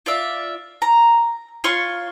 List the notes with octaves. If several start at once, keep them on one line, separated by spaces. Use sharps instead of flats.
F4 D5 E5
A#5
F4 C#5 C6 C#6